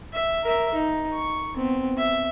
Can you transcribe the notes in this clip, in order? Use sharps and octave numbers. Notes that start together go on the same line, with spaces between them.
E5
A#4 E5
D#4
C#6
B3 C4
E5